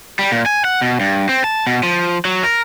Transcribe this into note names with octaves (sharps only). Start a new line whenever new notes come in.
G3
A#2
G#5
F#5
B2
G2
C4
A5
B2
F3
F#3
A#4